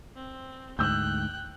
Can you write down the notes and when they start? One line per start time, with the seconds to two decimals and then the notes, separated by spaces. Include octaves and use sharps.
0.16 C4
0.79 D2 G#2 G5 E6 F#6 G6